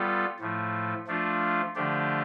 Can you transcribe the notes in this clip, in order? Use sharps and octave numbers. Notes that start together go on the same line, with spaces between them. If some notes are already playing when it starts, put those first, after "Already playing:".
Already playing: G3 B3 F4 A4
A2 F3 A3
F3 A3 D4 F4
D3 F3 A3 D4 G4